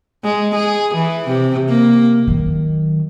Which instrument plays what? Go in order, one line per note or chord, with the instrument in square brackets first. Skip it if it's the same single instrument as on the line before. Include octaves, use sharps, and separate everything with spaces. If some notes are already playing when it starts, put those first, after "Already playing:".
[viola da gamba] G#3
G#4
E3
C3
A#3
[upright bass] D#3 F#3